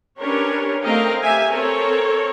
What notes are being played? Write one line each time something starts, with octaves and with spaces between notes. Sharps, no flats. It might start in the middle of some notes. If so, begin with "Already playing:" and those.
C#4 D4 G4 A#4 B4 C#5
A3 C4 A#4 D#5 F5 G5
G4 E5 G#5
C4 A4 A#4 C#5